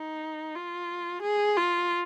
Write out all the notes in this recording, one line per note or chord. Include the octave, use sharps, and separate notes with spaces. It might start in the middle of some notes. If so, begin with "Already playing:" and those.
Already playing: D#4
F4
G#4
F4